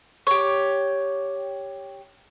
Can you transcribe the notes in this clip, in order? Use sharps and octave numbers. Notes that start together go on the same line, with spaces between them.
G4 C#5